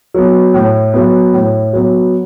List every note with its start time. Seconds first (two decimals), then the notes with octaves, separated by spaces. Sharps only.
0.14 F#3 B3
0.54 A2
0.94 F#3 B3
1.33 A2
1.73 F#3 B3